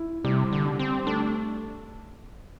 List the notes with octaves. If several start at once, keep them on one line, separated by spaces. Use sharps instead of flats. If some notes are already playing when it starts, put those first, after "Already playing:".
Already playing: E4
C3 G3
D3
G3
C4
A3 D4